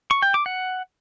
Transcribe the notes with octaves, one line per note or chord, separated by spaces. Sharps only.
C#6
G5
D6
F#5